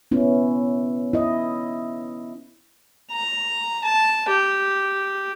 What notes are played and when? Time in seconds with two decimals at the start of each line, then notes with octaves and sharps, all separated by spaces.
0.11 B3 C#4 E4
1.13 E4 D#5
3.11 A#5
3.84 A5
4.29 G4